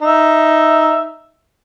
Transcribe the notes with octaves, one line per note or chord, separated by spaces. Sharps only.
D#4 E5